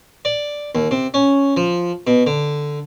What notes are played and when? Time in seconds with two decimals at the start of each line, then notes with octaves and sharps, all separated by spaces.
0.25 D5
0.75 D#2
0.91 C3
1.14 C#4
1.57 F3
2.07 B2
2.26 D3